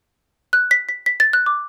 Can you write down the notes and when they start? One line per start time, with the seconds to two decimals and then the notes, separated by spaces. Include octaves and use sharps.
0.53 F#6
0.71 B6
0.89 B6
1.06 B6
1.20 A6
1.33 F#6
1.46 D6